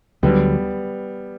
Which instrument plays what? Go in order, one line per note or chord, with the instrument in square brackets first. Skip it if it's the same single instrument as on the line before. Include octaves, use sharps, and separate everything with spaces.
[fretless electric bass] D2 D3 F#3 [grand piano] G3 B3